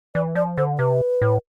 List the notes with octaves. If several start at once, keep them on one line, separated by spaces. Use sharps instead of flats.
E3 D5
F3 D5
D3 C5
C3 B4
A2